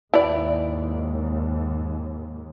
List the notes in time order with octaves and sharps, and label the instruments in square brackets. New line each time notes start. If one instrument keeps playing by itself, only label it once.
[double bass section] D#2 G#2 [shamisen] E4 B4 D5